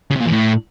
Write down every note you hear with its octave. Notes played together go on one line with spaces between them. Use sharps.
C#3
C3
A#2
E2
A2